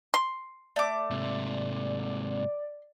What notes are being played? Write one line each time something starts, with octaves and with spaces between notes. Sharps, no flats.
C6
A3 D5 D6
G#2 C3